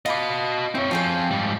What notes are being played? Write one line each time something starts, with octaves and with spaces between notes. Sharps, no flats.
F4 F#4 D#5 B5 D6
C4 E4 C#5
F3 C4 F4 G#4 G5
G#2 G3